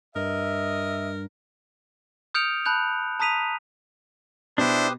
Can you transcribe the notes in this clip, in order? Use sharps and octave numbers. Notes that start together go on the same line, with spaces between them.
G2 A#4 D#5 E5
D#6 F6 G6 C#7 D7 F7
A5 B5 F#6 G6 F7
A5 A#5 D#6 B6 D#7 F7
B2 D4 E4 G4 B4 C5 D#6